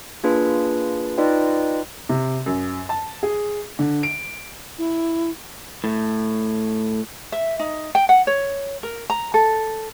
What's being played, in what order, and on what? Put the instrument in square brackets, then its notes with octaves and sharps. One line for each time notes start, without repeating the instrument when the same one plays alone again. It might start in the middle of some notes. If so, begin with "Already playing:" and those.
[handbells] A#3 D4 F4 G#4 B4
D#4 F4 B4 D5 D#5 G5
[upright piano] C3
F#2
A5
G#4
D3
D7
[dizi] E4
[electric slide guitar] A2
[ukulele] E5
D#4
G5
F#5
C#5
A#4
A#5
A4